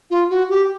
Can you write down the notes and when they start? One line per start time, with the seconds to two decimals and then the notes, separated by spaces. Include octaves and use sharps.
0.10 F4
0.30 F#4
0.49 G4